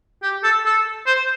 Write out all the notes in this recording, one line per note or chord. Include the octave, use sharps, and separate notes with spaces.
G4
A4
A4
C5